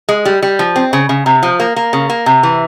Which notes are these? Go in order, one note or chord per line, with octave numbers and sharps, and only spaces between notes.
G#3
G3
G3
F3
C4
C#3
C#3
C3
F3
A#3
A#3
C#3
A#3
C3
E3